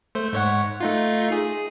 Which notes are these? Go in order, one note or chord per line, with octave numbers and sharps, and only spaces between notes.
A3 C5
G#2 C#5 F#5
A3 D#4 F4
G#4